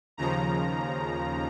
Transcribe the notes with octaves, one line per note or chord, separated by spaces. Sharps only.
D#2 C#3 F3 A#5